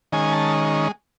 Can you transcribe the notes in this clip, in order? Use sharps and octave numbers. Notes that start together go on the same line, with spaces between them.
D#3 G#3 C#4 G#5
A5